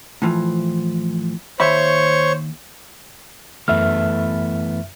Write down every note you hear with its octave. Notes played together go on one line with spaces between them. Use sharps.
A2 E3 F3
D#2 C5 C#5 E5 B5 C#6
F#2 E3 A3 B3 E5 F6